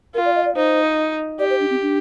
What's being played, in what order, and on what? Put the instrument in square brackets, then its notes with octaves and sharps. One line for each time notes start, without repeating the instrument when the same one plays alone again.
[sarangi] F4 [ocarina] A#4
[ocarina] D5
D#5
D5
[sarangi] D#4 [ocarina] C5
[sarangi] G4 [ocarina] D5
[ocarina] C5
D4
C4
D4